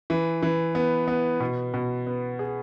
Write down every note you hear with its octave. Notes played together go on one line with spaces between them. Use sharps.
E3
E3
B3
B3
B2
B2
B3
G#4